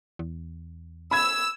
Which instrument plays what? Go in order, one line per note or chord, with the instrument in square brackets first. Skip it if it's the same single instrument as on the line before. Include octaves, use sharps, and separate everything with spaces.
[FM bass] E2
[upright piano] B5 G#6 [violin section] E6